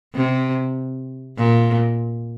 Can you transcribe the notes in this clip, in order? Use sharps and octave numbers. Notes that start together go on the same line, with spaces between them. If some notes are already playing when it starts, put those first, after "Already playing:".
C3
A#2